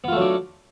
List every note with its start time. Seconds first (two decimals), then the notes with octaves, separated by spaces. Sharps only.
0.04 B3
0.08 F4
0.12 A3
0.17 F#3
0.21 D4